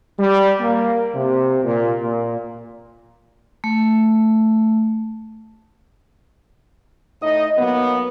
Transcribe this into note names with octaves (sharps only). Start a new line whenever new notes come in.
G3
A#3
C3
A#2
A#2
A3
A2 D#4 D#5
F#3 A#3 B3